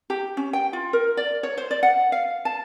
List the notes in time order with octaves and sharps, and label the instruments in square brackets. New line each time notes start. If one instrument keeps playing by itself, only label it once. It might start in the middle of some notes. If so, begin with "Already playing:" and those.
[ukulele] G4
C#4
G5
F4
A#4
D5
C#5
C5
D5
F#5
F5
A5